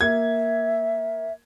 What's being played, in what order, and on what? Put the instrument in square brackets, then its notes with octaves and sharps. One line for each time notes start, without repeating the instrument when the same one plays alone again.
[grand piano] A#3 G#6 [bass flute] E5